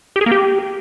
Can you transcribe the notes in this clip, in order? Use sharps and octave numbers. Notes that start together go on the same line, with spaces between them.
G4
G#4
A#3
G4